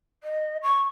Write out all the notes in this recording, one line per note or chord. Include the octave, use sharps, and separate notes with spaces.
D#5
C#6